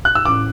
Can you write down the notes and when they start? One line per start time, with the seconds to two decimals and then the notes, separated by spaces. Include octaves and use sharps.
0.05 F#6
0.15 E6
0.25 A1 D6